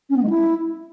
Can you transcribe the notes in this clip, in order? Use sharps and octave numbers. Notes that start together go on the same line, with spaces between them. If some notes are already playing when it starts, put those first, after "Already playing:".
C#4
B3
G#3
E4